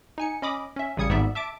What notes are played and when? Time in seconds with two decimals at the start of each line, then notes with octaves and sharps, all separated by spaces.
0.18 D#4 G#5 C#7
0.42 C#4 D#5 B5 D6 D#6
0.76 C#4 E5
0.97 A1 C#3 G3 D#6 G#6 C#7
1.09 G#1 G#2 G3 B3 D5 E5
1.35 E5 A5 D6 D7